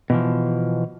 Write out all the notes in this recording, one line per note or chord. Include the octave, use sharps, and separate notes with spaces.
B2 E3 F3